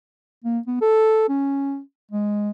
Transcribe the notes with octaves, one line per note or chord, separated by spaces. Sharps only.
A#3
B3
A4
C#4
G#3